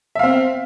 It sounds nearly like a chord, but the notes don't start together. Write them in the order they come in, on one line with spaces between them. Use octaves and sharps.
E5 F5 C4